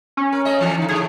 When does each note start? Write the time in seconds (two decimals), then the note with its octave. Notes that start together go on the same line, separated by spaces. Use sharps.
0.17 C#4
0.33 A#4
0.45 A3 D#5
0.59 D3 E3 F3
0.78 D3 D#4
0.89 A2 C#3 G#4